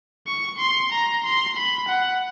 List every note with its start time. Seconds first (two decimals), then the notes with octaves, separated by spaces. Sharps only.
0.27 C#6
0.58 C6
0.92 A#5
1.24 C6
1.56 B5
1.88 F#5